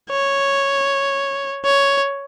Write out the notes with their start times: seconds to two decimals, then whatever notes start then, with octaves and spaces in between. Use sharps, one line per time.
0.11 C#5
1.64 C#5